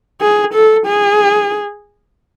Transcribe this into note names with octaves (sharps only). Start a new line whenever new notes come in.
G#4
A4
G#4